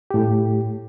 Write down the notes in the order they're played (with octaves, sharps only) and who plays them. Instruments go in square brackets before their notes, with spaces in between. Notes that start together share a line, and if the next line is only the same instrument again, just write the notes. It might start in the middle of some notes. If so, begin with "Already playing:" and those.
[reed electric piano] A2 G4